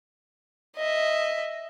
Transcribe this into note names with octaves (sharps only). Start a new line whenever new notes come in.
D#5 E5